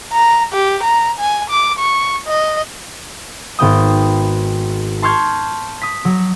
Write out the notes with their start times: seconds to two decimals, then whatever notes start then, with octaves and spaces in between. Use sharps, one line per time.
0.13 A#5
0.53 G4
0.84 A#5
1.19 G#5
1.50 D6
1.79 C#6
2.27 D#5
3.59 G#1 B3 G5 D#6
5.02 A5 C6 C#6 F6 G6 G#6
5.82 D#6 B6
6.05 F#3